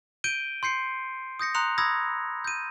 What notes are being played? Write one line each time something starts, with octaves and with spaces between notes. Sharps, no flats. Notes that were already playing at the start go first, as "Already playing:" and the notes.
G6 D7 D#7 G7
C6 G6 C7 C#7
D#6 G6 A#6 C#7
A#5 C6 D#6 F#6 C#7 F7
B5 D#6 E6 G#6 A#6
G6 D#7